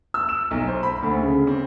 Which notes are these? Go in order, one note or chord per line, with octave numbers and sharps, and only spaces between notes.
E6
E7
B1
C5
B5
D2
C#3
C4